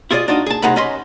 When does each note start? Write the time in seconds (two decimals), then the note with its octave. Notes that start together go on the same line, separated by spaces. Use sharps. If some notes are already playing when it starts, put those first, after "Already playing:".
0.11 E4 F4 G#4 A#4 D5 D#5
0.28 D4 D#4 F4 F#4 D#5
0.46 G#4 A5
0.62 C2 G#3 D#4 F#5 A#5 B5
0.76 C#4 B4 D#5 B5 C6